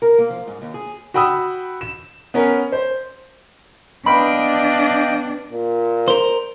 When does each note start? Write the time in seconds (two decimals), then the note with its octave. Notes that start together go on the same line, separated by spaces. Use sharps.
0.02 A#4
0.18 A#3
0.30 F3
0.47 G#2
0.62 D#2
0.74 G#4
1.14 F#4 G5 B5 D#6 E6
1.81 E7
2.34 B3 C#4 A#4
2.72 C5
4.06 B3 D4 D#5 F5 G5 B5
5.52 A#2
6.08 A#4 C5